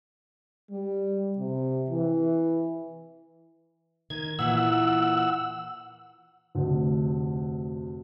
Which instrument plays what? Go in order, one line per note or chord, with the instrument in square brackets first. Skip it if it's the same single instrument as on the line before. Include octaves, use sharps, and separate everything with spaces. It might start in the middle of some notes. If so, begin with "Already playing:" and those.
[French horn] G3
C3
E3
[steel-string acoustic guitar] D#3 [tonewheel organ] G#6
[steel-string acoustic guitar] A#2 E3 [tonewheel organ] F#5 E6
[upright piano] F1 D2